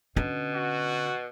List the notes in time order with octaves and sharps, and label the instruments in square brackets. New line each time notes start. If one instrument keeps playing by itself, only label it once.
[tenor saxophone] B2 [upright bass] D3 C#4
[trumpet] F#4